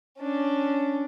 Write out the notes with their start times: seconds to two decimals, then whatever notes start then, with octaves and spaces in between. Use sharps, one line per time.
0.19 C#4 D4